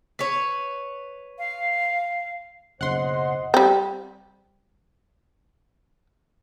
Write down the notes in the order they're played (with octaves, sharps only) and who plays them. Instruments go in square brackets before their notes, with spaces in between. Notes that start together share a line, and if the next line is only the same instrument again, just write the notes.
[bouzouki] B4 C#5
[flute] F5
[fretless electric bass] F#1 B1 C#3 [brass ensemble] C5 D#5 [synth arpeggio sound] F#5 C6
[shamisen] G3 C4